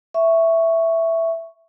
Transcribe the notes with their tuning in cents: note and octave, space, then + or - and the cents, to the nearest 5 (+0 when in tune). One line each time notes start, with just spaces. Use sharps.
E5 +0 C#6 +0